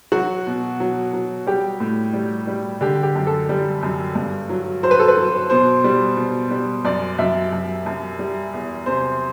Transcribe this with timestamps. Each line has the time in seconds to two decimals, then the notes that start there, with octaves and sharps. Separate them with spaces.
0.12 F#3 F#4
0.47 B2
0.80 F#3
1.13 F#3
1.47 G3 G4
1.80 A2
2.13 G3
2.47 G3
2.81 D3 G4
3.03 G4
3.15 F#2
3.27 A4
3.49 G3
3.83 F#2
4.15 G2
4.49 F#3
4.83 F#3 C5
4.91 B4
4.99 A4
5.08 B4
5.17 F#3
5.50 B2 C5
5.84 G3
6.17 B2
6.51 G3
6.85 F#2 D5
7.18 F#2 E5
7.52 F#2
7.86 F#2
8.19 G3
8.53 E2
8.86 C3 C5